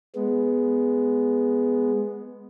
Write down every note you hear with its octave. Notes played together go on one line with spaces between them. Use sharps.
G#3 B3